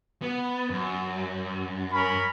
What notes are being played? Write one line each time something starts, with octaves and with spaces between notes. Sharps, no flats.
B3
F#2
C#4 A#4 B5